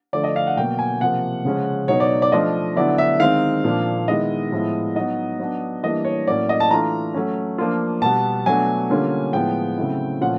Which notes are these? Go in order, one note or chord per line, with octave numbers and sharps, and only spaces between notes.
D3 F3 A3 D5
D#5
F5
F#5
B2 F#3 A#3 G5
G#5
C3 F3 A#3 F#5
C#3 F3 G#3 C#4
B2 F#3 B3 D#4 C#5
D5
D5
F3 A3 D4 F4 D#5
D3 F#3 B3 E4 D5
E5
D#3 G#3 C4 D#4 F5
A#2 F3 A#3 D4
D#3 G#3 B3 E4 D#5
A2 F3 G#3 B3 E4
F#3 B3 D#4 D#5
F#3 B3 D4
E3 G3 A#3 D4 D#5
C#5
A2 F#3 A#3 C#4 D5
D#5
A5
E3 A3 D4 F4 A#5
F#3 A3 C#4
F3 A#3 D4 F4
B2 G3 B3 A5
B2 F#3 A3 D4 G#5
D3 G3 A#3 C#4 F4
A2 F3 G#3 B3 G5
C#3 F#3 A3 C4 E4
A#2 F3 A3 C#4 F4 F#5